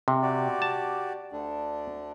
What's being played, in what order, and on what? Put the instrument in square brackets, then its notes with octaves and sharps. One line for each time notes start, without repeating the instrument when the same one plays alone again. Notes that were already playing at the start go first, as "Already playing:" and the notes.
[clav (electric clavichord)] C3
[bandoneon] F#4 G4 D5
[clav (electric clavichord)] A5
[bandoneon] D2 D3 D4